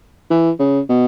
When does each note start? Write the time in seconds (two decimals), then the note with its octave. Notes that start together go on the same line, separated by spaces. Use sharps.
0.30 E3
0.59 C#3
0.89 B2